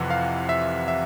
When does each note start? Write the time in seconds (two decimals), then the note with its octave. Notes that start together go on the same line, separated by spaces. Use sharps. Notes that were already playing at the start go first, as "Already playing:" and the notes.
Already playing: F2 C3 E3 F#5
0.10 F5
0.49 E5
0.88 E5